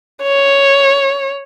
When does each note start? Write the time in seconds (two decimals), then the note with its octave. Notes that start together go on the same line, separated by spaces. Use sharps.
0.23 C#5